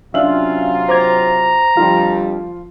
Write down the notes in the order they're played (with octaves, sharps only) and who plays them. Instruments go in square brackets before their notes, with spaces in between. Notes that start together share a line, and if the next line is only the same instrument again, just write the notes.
[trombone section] C3 F#3 F4 [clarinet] C#4 [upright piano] D4 F#7 [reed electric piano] E5 F5
[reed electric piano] C5 D6 G#6 [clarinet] A#5
[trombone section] F2 D3 G3 [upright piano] F3 F4 [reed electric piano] F5